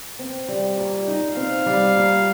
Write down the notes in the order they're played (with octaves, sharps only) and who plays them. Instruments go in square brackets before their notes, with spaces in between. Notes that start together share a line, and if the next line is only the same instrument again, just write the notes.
[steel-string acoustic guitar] C4
G3
A#2
D#4
[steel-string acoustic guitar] C4 [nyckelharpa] F5
[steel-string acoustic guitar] G3
A#2